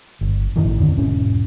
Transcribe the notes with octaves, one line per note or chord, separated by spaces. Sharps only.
G1
A1 F#2 D#3 E3
F2 D3 C4
E1 G#2 C#4